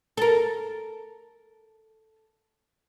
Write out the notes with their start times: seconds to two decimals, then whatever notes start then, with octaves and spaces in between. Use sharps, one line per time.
0.17 A4 A#4